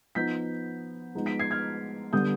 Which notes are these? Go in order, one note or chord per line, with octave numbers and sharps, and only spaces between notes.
F3 B3 D#4 G6 B6
F3 G#3 B3 D#4
B6 D7
G#6 C7
F6 G#6
D3 G3 B3 D#6 G6